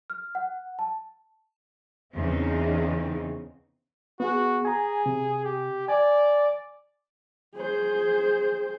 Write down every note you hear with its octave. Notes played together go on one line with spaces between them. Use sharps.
F6
F#5
A5
E2 C#3 C4 D#4
B3 F#4 G#4
G#4 G#5 A#5
C3
G4
D5 G#5
G#4 C5